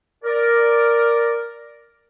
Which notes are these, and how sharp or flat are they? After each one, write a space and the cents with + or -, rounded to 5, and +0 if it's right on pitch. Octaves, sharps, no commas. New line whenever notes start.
A#4 +0 D5 +0